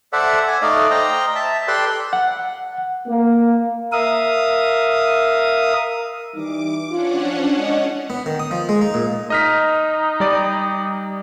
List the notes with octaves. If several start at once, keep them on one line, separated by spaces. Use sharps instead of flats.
A4 C5 D5 E5 F#5
G#5
A3 D#4 D5 D#5 F5
C5 D#5 G5 A#5
E5 A5
G4 A4 B4 D5 G5 C6
F#5
A#3
A#4 E5 F5 D#6
E3 G3 D#4 D6
C#4 D4 F4 F#5
F3
E3 G#3 D#5
B3
D#3
D#6
F3
G#3
D#4
A#2
D#4 D#5 F6 B6
G3 D5